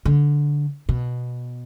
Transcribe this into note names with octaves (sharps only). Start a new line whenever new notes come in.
D3
B2